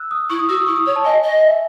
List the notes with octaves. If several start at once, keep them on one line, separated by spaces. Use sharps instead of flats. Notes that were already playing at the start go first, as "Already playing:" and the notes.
Already playing: E6 F#6
D#6
E4 C#6
D#6
F#4 E6
D#6
E4 C#6
D#6
C#5 C#6
A5
D#5 G#5
D#5
E5